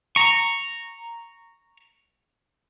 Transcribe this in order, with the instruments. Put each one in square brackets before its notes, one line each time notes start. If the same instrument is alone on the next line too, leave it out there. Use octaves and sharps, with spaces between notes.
[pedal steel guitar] A#5 C#6